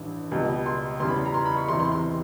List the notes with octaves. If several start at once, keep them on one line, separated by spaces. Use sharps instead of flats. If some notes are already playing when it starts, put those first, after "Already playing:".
Already playing: A1 G2 E3
C#2 B2 G3
C6
E2 C#3 E3 G3 C6
B5
A#5
C6
B5
C#6
E2 C3 E3 C6
C6
C6